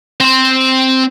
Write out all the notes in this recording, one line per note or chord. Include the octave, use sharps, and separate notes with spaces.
C4 C5